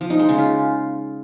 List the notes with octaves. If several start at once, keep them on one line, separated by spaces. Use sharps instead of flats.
F3
D#4
G#3
C#3
F4